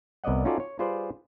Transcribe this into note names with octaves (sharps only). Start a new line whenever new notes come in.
C2 B3 D5 D#5 F#5
C#4 D#4 F4 F#4 A4 D5
C#5
G3 F4 G#4 B4 C5 D5